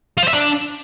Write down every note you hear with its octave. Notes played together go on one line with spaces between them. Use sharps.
F4
C5
E5
D4